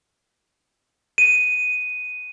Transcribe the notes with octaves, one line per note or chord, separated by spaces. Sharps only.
D#7